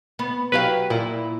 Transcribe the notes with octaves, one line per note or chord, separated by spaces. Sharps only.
B3
F#3 G4 B4 F5
A#2 E4